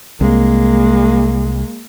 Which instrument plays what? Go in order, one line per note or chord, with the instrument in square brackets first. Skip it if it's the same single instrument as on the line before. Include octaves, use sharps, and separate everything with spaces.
[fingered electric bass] C2 [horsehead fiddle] G#3 A#3